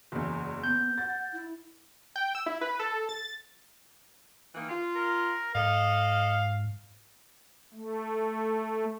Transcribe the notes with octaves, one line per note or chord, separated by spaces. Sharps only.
F#1 E2
B3 G6
F#5 A6
E4
G5
E6
E4
B4
A4
A6
D#3 E3 A#3
F4
A#4
G#2 A4 D#5 F5
A3